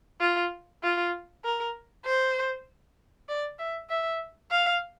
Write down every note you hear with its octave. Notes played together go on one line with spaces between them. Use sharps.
F4
F4
A#4
C5
D5
E5
E5
F5